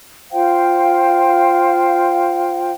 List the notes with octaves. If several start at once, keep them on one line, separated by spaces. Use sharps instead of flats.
F4 C5 F5 G5